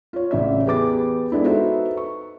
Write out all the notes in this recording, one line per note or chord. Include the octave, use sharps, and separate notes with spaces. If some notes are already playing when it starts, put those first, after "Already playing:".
F4 C#5
A1 C#3 D5 E5
E2 G4 G#4 B4 D6 A6
G#3 B3 D4 E4
D#4 F#4 A4 B4 C5 E5
C#6